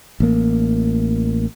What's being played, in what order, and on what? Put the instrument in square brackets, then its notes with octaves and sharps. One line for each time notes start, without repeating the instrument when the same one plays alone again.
[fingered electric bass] A1 A#3